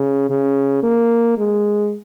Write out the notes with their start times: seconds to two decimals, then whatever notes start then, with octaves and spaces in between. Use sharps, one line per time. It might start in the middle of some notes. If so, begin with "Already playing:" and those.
Already playing: C#3
0.30 C#3
0.83 A#3
1.38 G#3